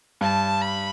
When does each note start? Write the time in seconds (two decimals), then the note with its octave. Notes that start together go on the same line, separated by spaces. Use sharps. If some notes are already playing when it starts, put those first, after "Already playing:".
0.21 G2 A5
0.62 B5